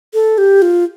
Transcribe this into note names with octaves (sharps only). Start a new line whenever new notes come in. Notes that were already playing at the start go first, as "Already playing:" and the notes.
A4
G4
F4